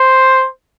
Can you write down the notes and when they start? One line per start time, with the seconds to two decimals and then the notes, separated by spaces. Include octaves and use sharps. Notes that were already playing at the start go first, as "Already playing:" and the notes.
Already playing: C5